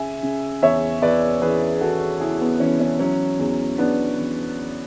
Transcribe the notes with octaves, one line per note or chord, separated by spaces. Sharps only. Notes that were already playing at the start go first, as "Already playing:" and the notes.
Already playing: C#3 E5 G#5
C#3
E2 C#5 E5
E2 B4 D5
E3 G#4 B4
E3 F#4 A4
C#3 E4 G#4
B3
E3 C#4
C#4
F#3 C#4
E2
E2 B3 D4
E2